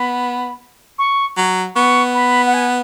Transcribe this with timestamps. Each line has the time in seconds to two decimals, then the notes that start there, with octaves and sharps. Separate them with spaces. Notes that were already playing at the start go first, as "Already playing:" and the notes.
Already playing: B3 B5
0.99 C#6
1.37 F#3
1.75 B3 C#6
2.15 B5
2.46 F#5
2.54 G#5